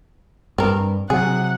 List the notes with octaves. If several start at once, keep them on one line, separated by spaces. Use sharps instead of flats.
G2 C4 A#4
C3 F#3 G#4 F#5